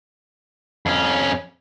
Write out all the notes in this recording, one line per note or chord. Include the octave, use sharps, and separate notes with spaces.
F2 C#4